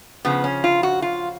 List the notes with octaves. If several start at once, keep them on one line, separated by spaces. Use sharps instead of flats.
C#3 F3 B3
C#4
F4
F#4
F4